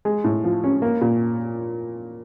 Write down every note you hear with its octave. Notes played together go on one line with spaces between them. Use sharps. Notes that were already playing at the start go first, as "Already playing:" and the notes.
G#3
A2
F3
C#4
A#3
A#2